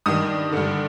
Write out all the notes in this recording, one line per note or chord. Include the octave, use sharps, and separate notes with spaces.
G2 D#3 D#6
G2 D3